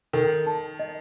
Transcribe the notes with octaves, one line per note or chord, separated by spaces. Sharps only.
D#3 A4
A5
D#5